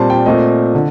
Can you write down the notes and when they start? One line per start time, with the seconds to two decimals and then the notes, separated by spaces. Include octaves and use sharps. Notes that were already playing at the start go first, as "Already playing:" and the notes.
Already playing: A#2 G3 C4 A5 C6
0.10 G5
0.25 A#2 A3 C4 D#5
0.75 D3